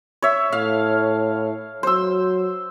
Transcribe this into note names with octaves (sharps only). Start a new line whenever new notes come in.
C#5 E5
A2 F5
F#3 C5 E6